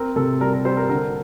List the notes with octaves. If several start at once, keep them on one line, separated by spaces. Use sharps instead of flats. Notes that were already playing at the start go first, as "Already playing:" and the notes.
Already playing: C4 A#4
C3 A4
G3 A#4
A#4
G3 C5
A#4
D3 A#4